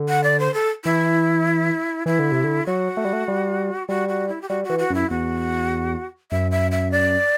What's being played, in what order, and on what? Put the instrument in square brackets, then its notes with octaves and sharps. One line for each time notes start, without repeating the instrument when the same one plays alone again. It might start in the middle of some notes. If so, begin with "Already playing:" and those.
Already playing: [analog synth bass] D3
[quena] F#5
D5
C5
A4
[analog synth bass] E3 [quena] E4
[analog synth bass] E3 [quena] E4
[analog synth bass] D3
C3
D3
[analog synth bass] F#3 [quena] F#4
[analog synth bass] A3
G3
A3
G3
[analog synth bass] G3 [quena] F#4
[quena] F#4
E4
G4
[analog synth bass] G3 [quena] F#4
[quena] F#4
[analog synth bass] E3
[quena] F#4
[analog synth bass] F#2 [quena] E4
[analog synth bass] E2 [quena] F#4
[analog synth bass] F#2 [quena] E5
[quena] E5
E5
D5